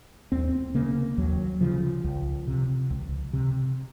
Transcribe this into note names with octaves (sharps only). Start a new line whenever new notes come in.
D#2 C4
C#3 A#3
D#2 F#3
C#3 F3
C#2
C3
C#2
C3